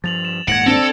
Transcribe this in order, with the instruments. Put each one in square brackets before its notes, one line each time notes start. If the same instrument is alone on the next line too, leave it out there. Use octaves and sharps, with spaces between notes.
[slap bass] G2 F3 [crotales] A6 F7 F#7
[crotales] E7
[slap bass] D#1 G#2 A#3 [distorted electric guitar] F#5 [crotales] G#6 A#6 D7
[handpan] C4 D4 [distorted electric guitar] A4 [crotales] A#6 D7 G7